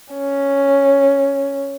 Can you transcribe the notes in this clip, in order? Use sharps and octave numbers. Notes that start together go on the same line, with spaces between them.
C#4